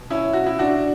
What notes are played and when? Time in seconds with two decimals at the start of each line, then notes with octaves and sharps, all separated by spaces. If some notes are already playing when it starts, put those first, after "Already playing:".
Already playing: B2 F#3
0.10 C#4 E4
0.33 F#4
0.46 E4
0.59 D4 F#4